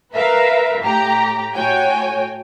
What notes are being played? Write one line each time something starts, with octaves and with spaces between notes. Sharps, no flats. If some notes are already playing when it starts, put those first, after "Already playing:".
A#4 B4 E5 F5
A2 G4 A#5
A2 F#4 C#5 G5 G#5